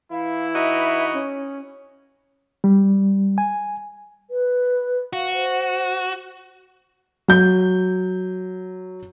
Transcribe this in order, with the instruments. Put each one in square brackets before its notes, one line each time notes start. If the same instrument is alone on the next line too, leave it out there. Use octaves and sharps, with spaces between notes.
[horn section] E3 E4 [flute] F5
[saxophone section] D#4 F#4 D#5 [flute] E5
[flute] C#4
[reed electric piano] G3
G#5
[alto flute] B4
[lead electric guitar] F#4 [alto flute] F5
[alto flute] C5
[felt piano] F#3 G6